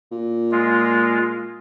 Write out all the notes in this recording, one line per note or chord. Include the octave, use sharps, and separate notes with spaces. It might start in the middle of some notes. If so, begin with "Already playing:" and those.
A#2
G#3 F4